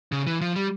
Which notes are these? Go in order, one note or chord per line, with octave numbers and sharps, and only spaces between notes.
C#3
E3
F3
G3